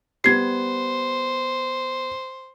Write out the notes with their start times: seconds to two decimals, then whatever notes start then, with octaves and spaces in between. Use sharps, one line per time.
0.24 G3 B3 C5 G#6 C7